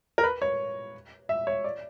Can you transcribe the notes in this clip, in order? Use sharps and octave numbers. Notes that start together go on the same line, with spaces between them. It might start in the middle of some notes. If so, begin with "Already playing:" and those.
A#4
B4
C#5
E5
C#5
D5